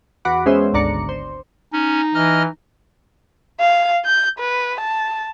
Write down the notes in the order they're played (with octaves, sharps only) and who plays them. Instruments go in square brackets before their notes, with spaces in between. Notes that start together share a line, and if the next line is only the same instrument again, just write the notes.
[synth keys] E2 F#4 F#5 B5 D6
G#3 B3 C#4 G#4 C5 E5
G#1 D2 D4 D5 A#5 C#7
C5
[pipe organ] C#4 [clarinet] D#4
[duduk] E3 [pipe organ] D#5 F6
[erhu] F5
G6
B4
A5